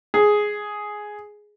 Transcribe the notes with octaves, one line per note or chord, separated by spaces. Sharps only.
G#4